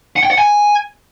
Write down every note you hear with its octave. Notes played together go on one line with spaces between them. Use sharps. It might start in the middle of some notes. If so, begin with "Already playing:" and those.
F#5
G5
F#5
G#5